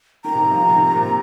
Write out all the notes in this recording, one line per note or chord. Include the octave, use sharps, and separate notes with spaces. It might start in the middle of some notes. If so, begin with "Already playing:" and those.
D#3 A#5
C3
D#3
F3
D#3
C3
D#3
A#2
C3